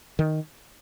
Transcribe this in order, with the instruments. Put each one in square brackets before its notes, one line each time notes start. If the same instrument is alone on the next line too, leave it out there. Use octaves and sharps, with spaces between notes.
[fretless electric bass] D#3